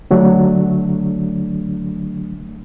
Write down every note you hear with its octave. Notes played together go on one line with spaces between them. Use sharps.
D3 F#3 A3 D4